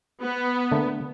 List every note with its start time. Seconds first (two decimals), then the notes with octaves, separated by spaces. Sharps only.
0.22 B3
0.72 D3 A3 A#3